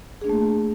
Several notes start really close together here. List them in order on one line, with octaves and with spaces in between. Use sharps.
G#4 D4 A#3 A3